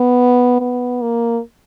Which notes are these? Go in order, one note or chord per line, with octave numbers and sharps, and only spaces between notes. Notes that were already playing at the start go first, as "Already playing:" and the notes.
Already playing: B3
B3
A#3